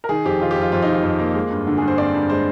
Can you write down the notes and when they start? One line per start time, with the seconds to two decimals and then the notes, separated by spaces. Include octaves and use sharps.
0.04 A#4
0.09 D#3 G#4
0.25 F2 G4
0.41 D#3 F4
0.51 G4
0.56 F2
0.61 F4
0.72 F2 F4
0.82 D#4
0.88 D#3 F4
1.03 F2
1.19 A#3
1.35 G#3
1.50 G2
1.67 D3
1.78 G#4
1.82 G2
1.88 C5
1.98 C4 D5
2.14 G2
2.30 G#3 C5